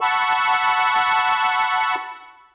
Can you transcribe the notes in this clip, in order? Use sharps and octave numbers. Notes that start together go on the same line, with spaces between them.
F#5 A5 B5 C#6 E6